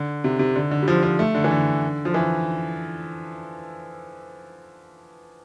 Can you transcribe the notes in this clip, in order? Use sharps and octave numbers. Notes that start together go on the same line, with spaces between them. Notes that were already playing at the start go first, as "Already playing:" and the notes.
Already playing: D3
C3
C3
D3
D3
G3
F3
F3
A3
D3
E3
D3
F3
E3